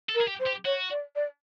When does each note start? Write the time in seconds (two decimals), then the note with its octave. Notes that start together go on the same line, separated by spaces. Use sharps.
0.09 A4
0.15 A#4
0.21 G#4
0.27 G4
0.40 C5
0.47 G4
0.65 F#4 C#5
0.90 D5
1.16 D5